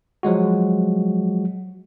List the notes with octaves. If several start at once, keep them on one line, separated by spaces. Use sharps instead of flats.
F3 F#3 G#3 F#4